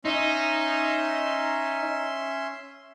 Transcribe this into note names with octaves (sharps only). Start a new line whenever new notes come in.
C#4 D#4 E5 C6